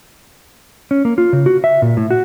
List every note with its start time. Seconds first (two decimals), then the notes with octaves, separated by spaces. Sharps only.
0.91 C#4
1.05 A#3
1.18 F4
1.33 C#3
1.46 F#4
1.64 E5
1.82 A#2
1.97 A2
2.11 F#4